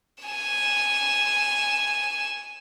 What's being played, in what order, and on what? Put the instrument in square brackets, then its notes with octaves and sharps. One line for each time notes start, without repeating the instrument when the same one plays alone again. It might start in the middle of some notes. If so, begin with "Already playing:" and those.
[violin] G#5 E7